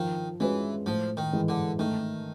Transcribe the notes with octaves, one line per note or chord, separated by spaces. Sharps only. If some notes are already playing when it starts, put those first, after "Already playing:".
Already playing: D#3 F3
E3 G#3 C#4 F#4 B4
A2 F3
D#3
E3 G#3
D3
D#3 A3